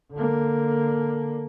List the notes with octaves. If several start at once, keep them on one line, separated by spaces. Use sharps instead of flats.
D3 A#3